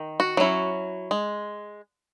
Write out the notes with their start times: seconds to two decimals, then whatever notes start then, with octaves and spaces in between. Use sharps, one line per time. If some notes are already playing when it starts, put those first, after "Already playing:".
Already playing: D#3
0.20 F#4
0.37 F#3 C#4 E4
1.11 G#3